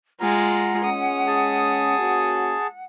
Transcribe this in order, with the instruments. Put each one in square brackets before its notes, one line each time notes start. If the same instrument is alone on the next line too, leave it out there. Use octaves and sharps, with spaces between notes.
[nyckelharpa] G#3 F4 [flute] F#5 [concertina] A#5
[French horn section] G#3 C#4 [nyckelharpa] D#6
[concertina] G#4 A5
[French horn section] A#3 C#4 F#4